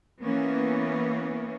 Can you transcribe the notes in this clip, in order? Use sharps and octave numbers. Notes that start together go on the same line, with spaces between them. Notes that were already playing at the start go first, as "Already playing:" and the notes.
E3 A#3 B3 C#4